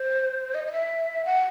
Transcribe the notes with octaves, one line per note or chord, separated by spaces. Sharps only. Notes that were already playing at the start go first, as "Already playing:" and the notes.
Already playing: C5
D#5
D#5
E5
F#5